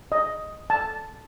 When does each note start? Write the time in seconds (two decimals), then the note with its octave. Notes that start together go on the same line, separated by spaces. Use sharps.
0.12 D#5
0.70 A5